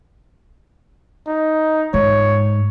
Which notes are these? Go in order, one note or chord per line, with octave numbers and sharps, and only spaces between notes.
D#4
G#2 C#5